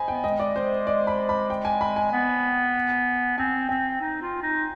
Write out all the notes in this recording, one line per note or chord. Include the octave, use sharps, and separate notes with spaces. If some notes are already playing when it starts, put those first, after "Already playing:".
Already playing: C5 D#5 G#5 B5
B3 G5
G#3 D#5
D5
C5
D5
B5
B5
G5
G#5
B5
G#5
B3
C4 G#5
C4 G5
D#4
F4
D#4